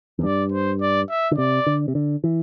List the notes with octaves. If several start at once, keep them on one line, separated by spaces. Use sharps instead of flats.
E2
G2 D5
C5
D5
E5
D3
C3 D5
D3
C3
D3
E3